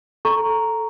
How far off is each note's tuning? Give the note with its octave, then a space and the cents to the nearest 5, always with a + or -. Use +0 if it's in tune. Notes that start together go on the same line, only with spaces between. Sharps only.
A4 +0 A#5 +0 C#6 +0